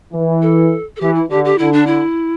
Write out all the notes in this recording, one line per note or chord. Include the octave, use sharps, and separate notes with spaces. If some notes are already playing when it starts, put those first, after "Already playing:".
E3
A4
A4
E3 G4
E4
D3 G4
G4
D3 E4
D4
E4